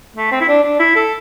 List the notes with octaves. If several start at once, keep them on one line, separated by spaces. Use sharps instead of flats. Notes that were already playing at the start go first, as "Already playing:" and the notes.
A3
C4
E4
D4
D4
E4
A4